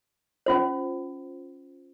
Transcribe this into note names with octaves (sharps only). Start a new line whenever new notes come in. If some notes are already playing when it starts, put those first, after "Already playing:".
C#4 F4 C5